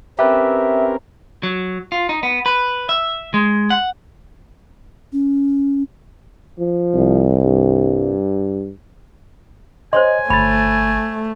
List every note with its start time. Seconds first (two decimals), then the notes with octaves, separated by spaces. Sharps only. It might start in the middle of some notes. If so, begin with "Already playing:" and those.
0.19 C4 C#4 G4 A#4 B4 E5
1.43 F#3
1.92 F4
2.09 D#4
2.23 B3
2.46 B4
2.89 E5
3.34 G#3
3.70 F#5
5.13 C#4
6.59 F3
6.95 C2
7.44 G2
9.93 C5 C#5 D#5 G#5 C6
10.30 G1 A3 B5 A6